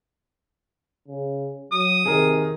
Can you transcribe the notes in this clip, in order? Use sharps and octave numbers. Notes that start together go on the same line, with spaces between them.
C#3
F#3 D#6
C3 D#3 G#4 A#4